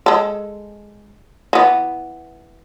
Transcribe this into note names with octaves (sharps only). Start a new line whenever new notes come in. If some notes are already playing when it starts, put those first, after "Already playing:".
G#3 A4
E3 B3